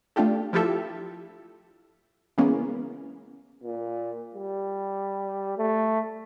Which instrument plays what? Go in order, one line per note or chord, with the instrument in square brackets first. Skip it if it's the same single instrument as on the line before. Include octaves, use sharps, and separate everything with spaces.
[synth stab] A3 D4 F4 G4 A4
F3 E4 F4 G4 A4 E5
C#3 E3 G#3 A#3 B3 C#4
[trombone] A#2
G3
A3